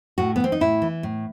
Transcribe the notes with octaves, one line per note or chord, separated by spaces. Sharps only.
A2 F#4
B3
E3 C4
D#4
A2 E4
E3
A2